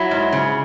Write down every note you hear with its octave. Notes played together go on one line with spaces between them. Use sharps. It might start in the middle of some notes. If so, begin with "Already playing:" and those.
Already playing: F#3 E4
G#2
C#3